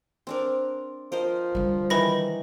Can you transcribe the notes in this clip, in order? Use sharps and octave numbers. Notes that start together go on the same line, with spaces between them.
C4 D4 A#4
F3 A#4 C5 D#5
D3 G3
D#3 E3 D#4 B4 B5 A#6